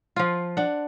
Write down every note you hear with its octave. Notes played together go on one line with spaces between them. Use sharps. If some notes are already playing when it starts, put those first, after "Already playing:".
F3 F4
D4 F#5